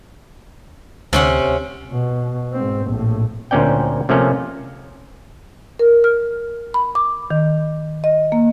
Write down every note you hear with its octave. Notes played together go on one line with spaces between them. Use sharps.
D2 C3 C#4 F#5
B2
G#2 C4
A#1 A2
D2 A#2 C4 C#4 D5 G5
C3 F3 A3 A#3 C#4
A#4
F6
B5
D6
D#3
D#5
A#3